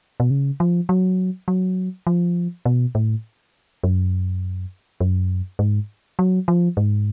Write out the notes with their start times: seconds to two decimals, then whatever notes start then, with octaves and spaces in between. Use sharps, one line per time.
0.20 B2
0.31 C#3
0.60 F3
0.89 F#3
1.48 F#3
2.07 F3
2.65 B2
2.95 A2
3.83 F#2
5.01 F#2
5.59 G#2
6.19 F#3
6.48 F3
6.77 G#2